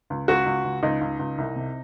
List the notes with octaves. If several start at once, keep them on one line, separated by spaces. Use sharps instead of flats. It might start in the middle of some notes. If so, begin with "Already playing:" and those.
C#2
C#2 F#4
C#2
C#2
C#2 D#4
C#2
C#2
C2
C3